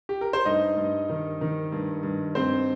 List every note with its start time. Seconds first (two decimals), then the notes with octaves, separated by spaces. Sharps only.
0.09 G4
0.21 A#4
0.33 C5
0.45 G2 D#4 D#5
0.77 G2
1.09 D#3
1.41 D#3
1.72 G2
2.03 G2
2.35 G2 C4 C5